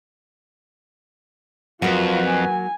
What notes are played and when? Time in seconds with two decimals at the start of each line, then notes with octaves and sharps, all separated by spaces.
1.82 F2 F#3 A#3 F4 F#4 B4
2.27 G#5